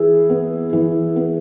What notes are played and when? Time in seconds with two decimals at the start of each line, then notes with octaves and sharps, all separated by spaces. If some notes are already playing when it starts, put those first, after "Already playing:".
Already playing: E3 E4 G#4
0.30 B3
0.73 E3
1.16 B3